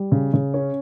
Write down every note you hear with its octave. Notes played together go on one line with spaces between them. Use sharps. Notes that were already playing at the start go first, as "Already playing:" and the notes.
Already playing: G3
C#3
C#3
C#4